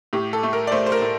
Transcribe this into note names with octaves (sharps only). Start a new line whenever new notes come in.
A2 G4
A4
A3
A#4
D5
A3 C5
C5
A#4
A2